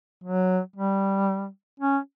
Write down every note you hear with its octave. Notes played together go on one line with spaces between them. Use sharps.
F#3
G3
C#4